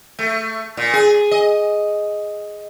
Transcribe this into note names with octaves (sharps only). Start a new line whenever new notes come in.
A3
A#2
G#4
D#5